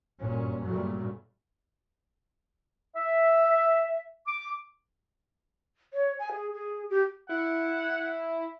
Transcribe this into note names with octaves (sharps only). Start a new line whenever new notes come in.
G1 F#2 A#2 C#4
G2 A#2 C#3 F#3 A3
E5
D6
C#5
G#5
G#4
G#4
G4
E4 F#5